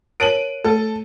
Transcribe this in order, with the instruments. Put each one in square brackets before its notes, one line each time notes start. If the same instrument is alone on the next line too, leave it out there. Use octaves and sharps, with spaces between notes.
[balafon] A#4 C#5 A5 [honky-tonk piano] D7 D#7 F#7
[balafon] A3 [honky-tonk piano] A4